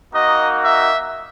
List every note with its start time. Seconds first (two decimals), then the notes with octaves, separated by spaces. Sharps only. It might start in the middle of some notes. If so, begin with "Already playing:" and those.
0.13 A#3 D#4 F#4 D#5
0.62 E5